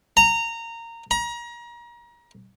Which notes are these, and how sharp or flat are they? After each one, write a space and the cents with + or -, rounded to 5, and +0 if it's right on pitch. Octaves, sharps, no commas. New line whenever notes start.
A#5 -15
A#5 +35